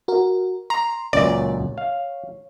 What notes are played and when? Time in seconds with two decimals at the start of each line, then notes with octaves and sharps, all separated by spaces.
0.08 F#4 A#4
0.70 A#5 C6
1.13 C#2 F#2 A#2 C#5 D5
1.78 F5